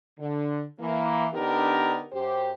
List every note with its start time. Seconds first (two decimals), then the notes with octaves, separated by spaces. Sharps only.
0.19 D3
0.80 E3 A#3
1.34 D3 B3 D4 D#4 G4 A#4
2.12 F#2 G4 C5